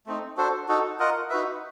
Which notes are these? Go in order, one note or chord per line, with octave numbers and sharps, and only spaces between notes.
A3 C4 D#4
D4 F#4 A4 C5
D#4 F#4 A4
F4 A#4 D#5 F#5
D#4 F#4 B4 E5